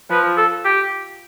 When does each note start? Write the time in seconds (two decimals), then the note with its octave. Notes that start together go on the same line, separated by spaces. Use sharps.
0.10 F3 B4
0.37 A4
0.65 G4